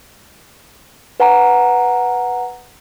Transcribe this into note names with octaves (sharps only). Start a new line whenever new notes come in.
B4 F#5 G#5 A#5